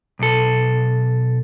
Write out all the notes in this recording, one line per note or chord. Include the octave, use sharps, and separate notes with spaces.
B1 A4